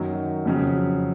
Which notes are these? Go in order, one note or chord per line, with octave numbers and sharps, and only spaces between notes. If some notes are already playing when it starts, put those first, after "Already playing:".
Already playing: F#2 D#3 F#3
F2 C#3 F#3